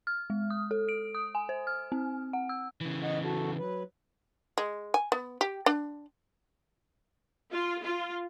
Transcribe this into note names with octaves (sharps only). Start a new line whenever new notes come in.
F6
G#3
D#6
A4
D7
D#6
G#5
C5
F6
C4
F#5
E6
C#3 E3
D#5 F#5
F#4 A4
F#3 B4
G#3
G#5
B3
G4
D4
F4
F4